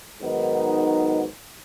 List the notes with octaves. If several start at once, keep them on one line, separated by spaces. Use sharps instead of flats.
G#2 D#3 F#3 B3 D#4